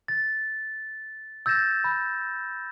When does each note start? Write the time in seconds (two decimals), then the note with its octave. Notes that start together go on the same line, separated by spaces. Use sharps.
0.08 A6
1.46 E6 G6 A6 A#6 E7
1.84 B5